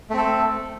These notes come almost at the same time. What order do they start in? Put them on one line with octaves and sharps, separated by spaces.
A3 C4 A4